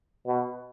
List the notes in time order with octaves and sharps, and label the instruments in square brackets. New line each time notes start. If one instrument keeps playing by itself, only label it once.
[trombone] B2